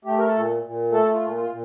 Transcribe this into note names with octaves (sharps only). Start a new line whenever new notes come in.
A3 G4
A#4
A4
A#2
A#2
A3 A4
F4
A#2
F4
A#2